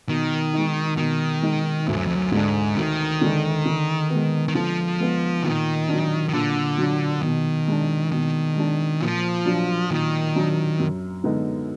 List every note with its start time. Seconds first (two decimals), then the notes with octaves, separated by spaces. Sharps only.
0.09 B2 D#3
0.53 G#3 D#4
0.98 B2 D#3
1.42 G#3 D#4
1.87 D2 G#2
1.97 F#2
2.07 F2
2.15 F#2
2.32 G#2 D3 G#3 D4
2.77 D2 D#3
3.21 D3 G#3 D4
3.65 D3
4.10 G#3 B3
4.48 D#3
4.55 D3 F3
5.00 G#3 B3
5.44 A#2 D#3
5.88 F#3 D4
6.29 D#3
6.33 A#2 D3
6.78 F#3 D4
7.23 B2 D#3
7.68 G#3 D4
8.12 B2 D#3
8.56 G#3 D4
9.01 A#2 F3
9.46 F#3 D4
9.90 A#2 D#3
10.35 F#3 D4
10.80 F#2
11.24 D3 G#3 B3 D#4